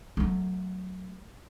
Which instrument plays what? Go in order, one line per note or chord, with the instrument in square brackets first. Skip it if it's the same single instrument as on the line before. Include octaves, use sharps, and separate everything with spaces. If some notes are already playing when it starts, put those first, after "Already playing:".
[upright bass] F#3 A3